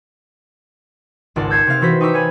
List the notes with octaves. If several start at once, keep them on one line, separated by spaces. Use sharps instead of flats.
G#1 C#2 F4 D5 F#5 A5
E6 G6 G#6 C7 C#7 E7
C3 C4 F5
E3 E4 F#4 C5 G6 B6
D#4 G5 C#6 D6 E6 B6
C#5 F5 G#5 B5